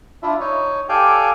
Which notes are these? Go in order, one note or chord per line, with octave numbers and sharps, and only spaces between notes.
D4 E4 F4 E5
D#4 C#5
G4 A4 D5 F5 G5 G#5